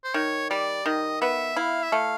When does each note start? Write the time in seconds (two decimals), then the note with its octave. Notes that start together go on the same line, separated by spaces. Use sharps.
0.04 C5
0.14 D#3 C#5
0.50 G3 D5
0.86 D#3 D#5
1.21 B3 E5
1.56 E4 F5
1.83 E5
1.92 A3 F5